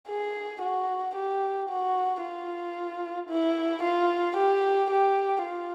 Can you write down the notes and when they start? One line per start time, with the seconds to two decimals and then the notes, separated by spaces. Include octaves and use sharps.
0.08 G#4
0.62 F#4
1.15 G4
1.69 F#4
2.23 F4
3.29 E4
3.83 F4
4.37 G4
4.90 G4
5.44 F4